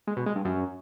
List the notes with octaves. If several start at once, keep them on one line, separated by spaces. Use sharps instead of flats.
G#3
B2
G#3
G2
F#2